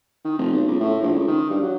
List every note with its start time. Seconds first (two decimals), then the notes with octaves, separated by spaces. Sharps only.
0.25 D#3
0.39 F1
0.53 B1
0.68 C#2
0.80 A2
1.02 A#1
1.15 C#2
1.28 D#3
1.50 G2
1.63 F#3